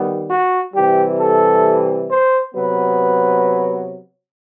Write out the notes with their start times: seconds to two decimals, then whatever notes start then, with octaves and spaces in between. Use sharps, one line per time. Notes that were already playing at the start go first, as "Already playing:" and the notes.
Already playing: D#3 G3 B3
0.29 F#4
0.74 C3 E3 G3 G4
1.19 A4
2.09 C5
2.54 C3 F#3 B3 B4